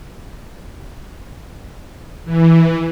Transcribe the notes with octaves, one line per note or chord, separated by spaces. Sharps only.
E3